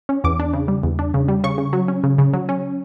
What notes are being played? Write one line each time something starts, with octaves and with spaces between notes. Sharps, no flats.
C#4
E2 D6
D4
C#3
G3
E2
D4
C#3
G3
C#3 C#6
C#3
F#3
C#4
C#3
C#3
F#3
C#4